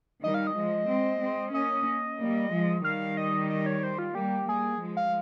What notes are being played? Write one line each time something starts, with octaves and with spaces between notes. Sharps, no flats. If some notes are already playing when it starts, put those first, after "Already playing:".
D#3 G3 D#5
F5
D#5
F3 G#3
G#3 C4
G#3 C4
A#3 C#4 D#5
G3 A#3
F3 G#3
D#3 G3 F5
D#5
D#5
C#5
C5
F4
G3 A#3 G4
G3 A#3 G#4
F3 G#3
F5